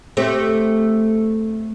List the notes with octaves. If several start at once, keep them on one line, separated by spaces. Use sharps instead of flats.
A3 C4 G4